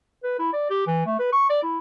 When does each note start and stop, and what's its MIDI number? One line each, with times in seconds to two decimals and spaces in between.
0.24 0.36 71
0.39 0.50 64
0.53 0.69 74
0.70 0.84 67
0.87 1.02 52
1.06 1.17 57
1.19 1.29 71
1.33 1.47 85
1.50 1.63 74
1.63 1.78 64